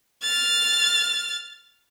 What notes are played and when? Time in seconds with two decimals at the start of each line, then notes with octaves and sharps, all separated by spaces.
0.23 F6 A6